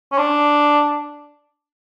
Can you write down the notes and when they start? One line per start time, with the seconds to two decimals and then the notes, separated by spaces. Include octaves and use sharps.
0.12 C#4
0.18 D4